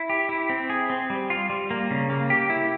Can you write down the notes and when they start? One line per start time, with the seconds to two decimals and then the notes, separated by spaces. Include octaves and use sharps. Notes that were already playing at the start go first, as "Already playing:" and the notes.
Already playing: E4
0.10 G4
0.29 E4
0.50 C4
0.70 G#4
0.90 C4
1.10 G3
1.30 F4
1.50 G3
1.71 A#3
1.91 C#3
2.10 A#3
2.30 G4
2.50 E4